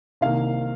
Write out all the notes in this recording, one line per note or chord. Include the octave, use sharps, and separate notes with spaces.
C2 C3 D#3 A#3 F5